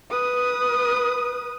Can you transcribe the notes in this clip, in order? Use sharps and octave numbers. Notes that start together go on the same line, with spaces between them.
B4 D#6